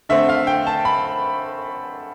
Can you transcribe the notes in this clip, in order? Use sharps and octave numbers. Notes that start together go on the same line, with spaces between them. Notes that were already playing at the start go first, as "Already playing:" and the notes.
D3 A3 C4 E5
F5
G5
A5
B5